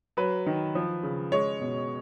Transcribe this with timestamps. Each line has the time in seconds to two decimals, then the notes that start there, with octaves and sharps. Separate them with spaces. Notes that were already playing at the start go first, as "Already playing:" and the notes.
0.17 F#3 B4
0.46 D#3
0.75 F3
1.03 C#3
1.32 G#3 C#5
1.60 B2